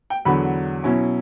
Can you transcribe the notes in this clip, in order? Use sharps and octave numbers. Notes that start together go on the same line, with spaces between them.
G5
E2 D3 F#3 B5
B2 F#3 C#4 E4